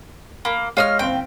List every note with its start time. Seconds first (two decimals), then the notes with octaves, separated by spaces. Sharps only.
0.45 A#3 B5
0.77 G#3 F4 C#5 D#5 D#6 F6
0.99 F#1 C4 F5 G5